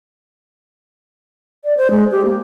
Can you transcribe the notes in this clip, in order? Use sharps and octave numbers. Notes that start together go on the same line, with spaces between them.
D5
C5
G#3
G4
A#3